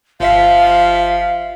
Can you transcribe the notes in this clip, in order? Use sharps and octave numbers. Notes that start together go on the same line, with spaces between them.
G1 F3 E5 F5 B6